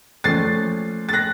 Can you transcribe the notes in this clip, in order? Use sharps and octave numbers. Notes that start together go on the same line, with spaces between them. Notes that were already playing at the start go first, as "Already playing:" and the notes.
A#2 F3 A3 C#4 A6 C7
A6
F#6 A#6